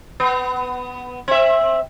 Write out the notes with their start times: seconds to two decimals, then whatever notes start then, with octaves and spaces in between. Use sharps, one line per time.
0.20 B3
1.28 C4 E5